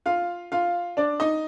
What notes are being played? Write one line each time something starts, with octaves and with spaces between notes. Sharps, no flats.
F4 F5
F4 F5
D4 D5
D#4 D#5